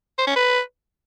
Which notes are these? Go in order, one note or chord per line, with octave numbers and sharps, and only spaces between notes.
C5
C#4
B4